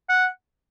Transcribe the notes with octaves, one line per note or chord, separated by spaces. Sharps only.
F#5